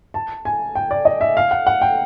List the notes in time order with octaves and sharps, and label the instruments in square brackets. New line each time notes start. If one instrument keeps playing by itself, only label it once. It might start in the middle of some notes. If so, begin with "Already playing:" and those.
[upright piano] A5
G#5
G5
D5
D#5
E5
F5
F#5
F#5
G5